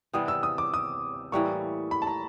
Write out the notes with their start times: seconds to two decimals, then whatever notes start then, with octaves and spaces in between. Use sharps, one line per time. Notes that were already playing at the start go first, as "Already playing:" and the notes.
0.13 C3 E3 G3 B3 D#6
0.28 E6
0.43 D#6
0.58 D6
0.74 D#6
1.32 A2 E3 G3 A#3 C#6
1.91 B5
2.02 A5
2.07 A#5